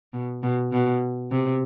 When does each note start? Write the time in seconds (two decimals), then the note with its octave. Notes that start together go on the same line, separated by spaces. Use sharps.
0.13 B2
0.43 B2
0.72 B2
1.31 C3